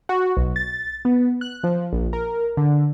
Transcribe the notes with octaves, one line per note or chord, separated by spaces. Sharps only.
F#4
B1
A6
B3
F#6
F3
A#1
A#4
D3